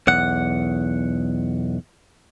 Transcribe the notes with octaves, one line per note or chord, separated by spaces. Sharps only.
B1 E2 F#5